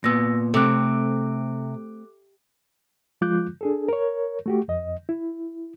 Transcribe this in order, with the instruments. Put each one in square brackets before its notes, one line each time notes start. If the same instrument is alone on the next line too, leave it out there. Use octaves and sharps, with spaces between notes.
[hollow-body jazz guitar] A#2 B3 [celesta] E6 A#6
[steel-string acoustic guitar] C3 [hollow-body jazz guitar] A3 C4 [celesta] A4 D6 F#6
[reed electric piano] F3 G#3 F4 D6 F#6 G6
D4 G#4 A4
A#4 C#5
A3 F#4 G4
F2 D#5
E4